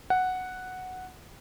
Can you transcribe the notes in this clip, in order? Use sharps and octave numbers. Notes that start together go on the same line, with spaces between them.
F#5